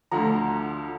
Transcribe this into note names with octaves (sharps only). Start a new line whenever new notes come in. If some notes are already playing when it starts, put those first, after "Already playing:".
D2 D3 F3 F#5 A#5